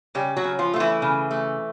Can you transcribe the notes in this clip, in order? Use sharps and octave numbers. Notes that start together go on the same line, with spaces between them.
C#3 G3 G4
F#3 F#4
C#3
F3 F4
A3 F4
E3 E4
C#3
A3